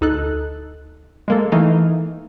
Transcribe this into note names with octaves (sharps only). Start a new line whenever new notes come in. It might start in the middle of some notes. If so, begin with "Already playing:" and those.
D2 D#4 A4 F#6
G#3 A#3 A4
E3 A3 D#4 F5